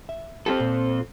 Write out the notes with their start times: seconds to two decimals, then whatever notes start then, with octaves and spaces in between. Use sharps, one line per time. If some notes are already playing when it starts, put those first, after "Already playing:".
0.09 E5
0.46 C4 F4 G4 A4
0.60 A#2